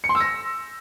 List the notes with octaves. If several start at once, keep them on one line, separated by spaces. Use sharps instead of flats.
C#7
C6
E6
A#6